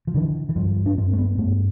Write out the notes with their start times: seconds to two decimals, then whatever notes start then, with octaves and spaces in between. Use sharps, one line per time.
0.07 F3
0.14 D3 E3
0.49 E3
0.56 G2 F3
0.86 D4
0.97 G2 C4
1.13 A3
1.18 B3
1.38 G2 A3